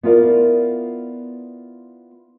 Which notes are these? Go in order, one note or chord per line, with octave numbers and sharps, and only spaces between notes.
B3 E4 F4 A#4 D5